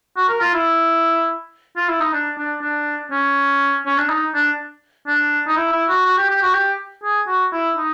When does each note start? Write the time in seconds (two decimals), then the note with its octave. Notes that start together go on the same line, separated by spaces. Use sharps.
0.17 F#4
0.29 A#4
0.41 F4
0.54 E4
1.76 F4
1.89 E4
2.00 D#4
2.13 D4
2.38 D4
2.62 D4
3.11 C#4
3.86 C#4
3.98 D4
4.09 D#4
4.34 D4
5.07 D4
5.47 D#4
5.57 E4
5.72 E4
5.89 F#4
6.05 F#4
6.18 G4
6.30 G4
6.42 F#4
6.54 G4
7.04 G#4
7.28 F#4
7.53 E4
7.77 D#4